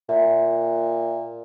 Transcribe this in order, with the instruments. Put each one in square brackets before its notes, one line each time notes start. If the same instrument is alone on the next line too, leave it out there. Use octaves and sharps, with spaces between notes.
[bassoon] A#2 [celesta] E5